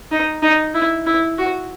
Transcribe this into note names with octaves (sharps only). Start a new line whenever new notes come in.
D#4
D#4
E4
E4
F#4